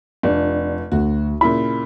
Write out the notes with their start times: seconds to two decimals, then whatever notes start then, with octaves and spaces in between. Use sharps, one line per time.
0.23 F1 D4
0.92 D2 F#4
1.41 A#2 C#3 E4 B5